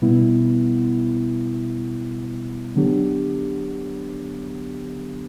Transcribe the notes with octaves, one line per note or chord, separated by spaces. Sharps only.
B2 G3 B3 E4
D3 F#3 B3 D4 G4